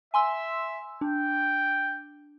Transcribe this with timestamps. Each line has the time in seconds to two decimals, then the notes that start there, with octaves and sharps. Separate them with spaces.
0.14 E5 G#5 C6 E6
1.01 D4 G5